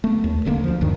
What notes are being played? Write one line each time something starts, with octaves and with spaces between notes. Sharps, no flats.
A3 B3
D#2
D#1 D3 A3 A#3
D2 F3
D2 G2 D#3